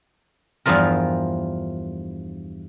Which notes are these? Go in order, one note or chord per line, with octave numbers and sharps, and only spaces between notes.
E2 G2 F3 F4 A#4